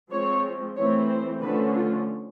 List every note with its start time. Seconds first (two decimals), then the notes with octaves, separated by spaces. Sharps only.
0.11 F3 G#3 C4 C#5
0.77 E3 A3 C4 C#5
1.09 C5
1.41 D3 F3 A3 C#4 B4
1.74 F4